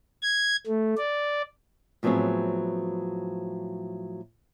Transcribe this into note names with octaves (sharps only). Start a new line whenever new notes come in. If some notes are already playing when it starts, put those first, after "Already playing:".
G#6
A3
D5
A2 F3 F#3 B3 C4 G#4